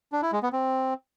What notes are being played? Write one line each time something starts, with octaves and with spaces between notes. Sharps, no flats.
D4
E4
G#3
B3
C4